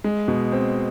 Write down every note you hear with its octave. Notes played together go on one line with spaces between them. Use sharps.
G#3
B2
C4